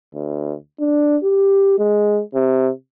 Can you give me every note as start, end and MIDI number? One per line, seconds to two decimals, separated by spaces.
0.15 0.54 38
0.80 1.17 62
1.23 1.76 67
1.79 2.21 56
2.34 2.70 48